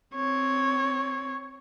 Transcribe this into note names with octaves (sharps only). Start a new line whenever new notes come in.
C4 C#5